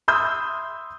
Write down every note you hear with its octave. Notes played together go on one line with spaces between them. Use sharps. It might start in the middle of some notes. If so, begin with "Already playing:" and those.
E5 B5 C6 D#6 E6 G6